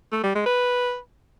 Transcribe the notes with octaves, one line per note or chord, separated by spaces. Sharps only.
A3
G3
G#3
B4